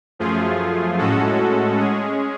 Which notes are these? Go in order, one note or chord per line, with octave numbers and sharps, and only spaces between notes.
F#2 F3 A3 F4 G#4
A2 G#3 C#4 F#4 A4
G#3 C#4 G#4